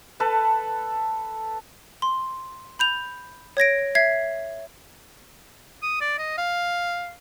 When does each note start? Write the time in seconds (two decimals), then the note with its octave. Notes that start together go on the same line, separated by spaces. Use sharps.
0.20 A4 B4 A5
2.02 C6
2.79 B5 G6 F7
3.57 C#5 G#6 A#6 D7
3.95 E5 G#6 C7
5.83 D#6
6.01 D5
6.19 D#5
6.38 F5